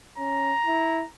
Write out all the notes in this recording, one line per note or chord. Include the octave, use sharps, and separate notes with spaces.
C#4 A#5
E4